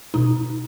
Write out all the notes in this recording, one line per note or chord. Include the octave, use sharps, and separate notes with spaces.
B2 D#4